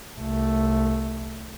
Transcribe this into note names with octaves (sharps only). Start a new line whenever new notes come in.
C2 A3